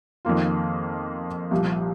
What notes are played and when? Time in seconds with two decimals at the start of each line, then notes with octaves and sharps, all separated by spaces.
0.25 F2 D#3 A#3 F4
1.51 C2 A#2 F3